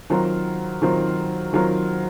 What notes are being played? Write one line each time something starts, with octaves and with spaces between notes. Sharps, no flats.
D#3 F#3 C4 F4 A#4
D#3 F#3 C4 F4 A#4
D#3 F#3 C4 F4 A#4